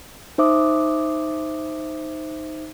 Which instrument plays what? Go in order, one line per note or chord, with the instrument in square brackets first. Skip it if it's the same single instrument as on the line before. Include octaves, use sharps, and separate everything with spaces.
[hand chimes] D#4 C5 E5 D6 D#6